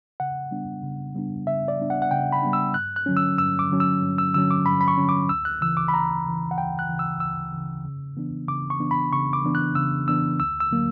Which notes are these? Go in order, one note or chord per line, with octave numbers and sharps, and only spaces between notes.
C#3 F#5
G3 B3 D4
C#3
G3 B3 D4
C#3 E5
D5
G3 B3 D4
F#5
F#5
C#3 G5
B5
G3 B3 D4
E6
G2 F#6
F#6
D3 F#3 C#4
E6
G2 E6
D6
D3 F#3 C#4
E6
G2
E6
D3 F#3 C#4 E6
D6
G2 B5
B5
C#6
D3 F#3 C#4
D6
D2 E6
F#6
C#3 E3 E6
D6
B5
D2 A#5
C#3 E3
F#5
D2 G5
F#6
C#3 E3
E6
D2 E6
C#3 E3
C#3
E3 B3 D4
C#3 D6
C#6
E3 B3 D4
B5
C#3 C#6
D6
E3 B3 D4
F#6
C#3 E6
E3 B3 D4 E6
D2 E6
E6
D3 F#3 A#3